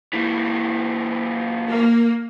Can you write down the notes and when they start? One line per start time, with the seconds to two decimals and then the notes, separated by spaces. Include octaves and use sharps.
0.13 A#2 E3
1.68 A#3